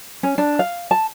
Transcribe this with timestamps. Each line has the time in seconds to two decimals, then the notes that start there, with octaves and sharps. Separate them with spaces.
0.23 C#4
0.38 D4
0.59 F5
0.91 A5